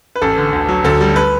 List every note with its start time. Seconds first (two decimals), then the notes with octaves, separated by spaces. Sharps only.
0.15 B4
0.22 A1 A4
0.38 D3
0.53 D2
0.68 F#3
0.84 D2 A4
1.01 G3
1.16 B4